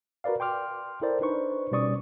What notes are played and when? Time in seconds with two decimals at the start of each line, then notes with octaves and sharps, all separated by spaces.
0.24 F#4 A#4 B4 D5 F5
0.40 G5 C6 D6 F6
1.02 E4 A4 A#4 C5 D5
1.21 D4 D#4 B4 C5 C#6
1.71 B2 G3 C#4 D5 C#6 D#6